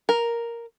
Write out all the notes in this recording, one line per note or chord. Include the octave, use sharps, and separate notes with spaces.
A#4